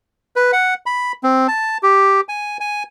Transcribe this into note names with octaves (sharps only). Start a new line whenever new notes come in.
B4
F#5
B5
C4
A5
G4
G#5
G#5